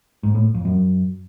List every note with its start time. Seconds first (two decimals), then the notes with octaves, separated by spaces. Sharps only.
0.23 G#2
0.35 A2
0.54 F2
0.65 F#2